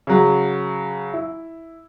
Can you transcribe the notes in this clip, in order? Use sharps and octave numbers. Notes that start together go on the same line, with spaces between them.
C#3 F#3
E4